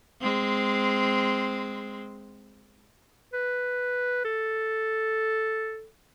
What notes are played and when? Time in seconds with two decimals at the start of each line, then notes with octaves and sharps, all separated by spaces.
0.21 G#3 C4
3.33 B4
4.25 A4